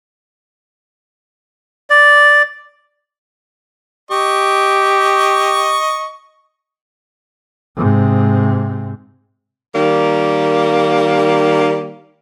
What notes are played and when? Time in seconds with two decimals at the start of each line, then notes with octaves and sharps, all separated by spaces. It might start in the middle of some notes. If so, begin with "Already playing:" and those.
1.90 D5
4.11 G4 D#5 C#6
7.76 G#2 C3
9.75 D#3 G3 A#3